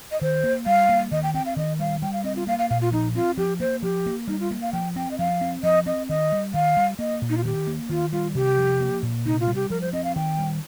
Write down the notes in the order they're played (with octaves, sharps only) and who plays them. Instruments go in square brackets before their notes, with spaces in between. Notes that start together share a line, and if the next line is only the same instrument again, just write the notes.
[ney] D#5
[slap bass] D#3 [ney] C5
[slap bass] A#3
[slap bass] G3 [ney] F5
[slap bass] A#3
[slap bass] D#3 [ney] D#5
[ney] G5
[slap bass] C4 [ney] G5
[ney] F5
[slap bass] D#3 [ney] D#5
[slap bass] G3 [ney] F5
[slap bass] G3 [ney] G5
[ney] F5
[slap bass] C4 [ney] D#5
[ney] F4
[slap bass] A#3 [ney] F5
[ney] F5
[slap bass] A#2 [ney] F5
[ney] F4
[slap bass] F3 [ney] D#4
[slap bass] C4 [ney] F4
[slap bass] F3 [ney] G4
[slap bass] A#3 [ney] C5
[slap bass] F3 [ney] G4
[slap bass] A#3
[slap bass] G3 [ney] D#4
[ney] F4
[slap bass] A#3
[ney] F5
[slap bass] F3 [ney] G5
[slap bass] C4 [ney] G5
[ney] D#5
[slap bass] F3 [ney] F5
[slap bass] C4
[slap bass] F3 [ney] D#5
[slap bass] C4 [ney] D#5
[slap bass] D#3 [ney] D#5
[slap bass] G3
[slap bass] D#3 [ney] F5
[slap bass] G3
[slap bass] A#3 [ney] D#5
[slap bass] A#2
[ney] D#4
F4
[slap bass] D#3 [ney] G4
[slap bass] A#3
[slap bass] D#3 [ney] F4
[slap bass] G3 [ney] F4
[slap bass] C3 [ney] G4
[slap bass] F3
A#3
A#2
[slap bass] C3 [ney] D#4
[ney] F4
[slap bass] G3
[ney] G4
[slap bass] F3 [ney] A#4
[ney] C5
[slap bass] C4 [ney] D#5
[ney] F5
[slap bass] D#3 [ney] G5
[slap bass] G3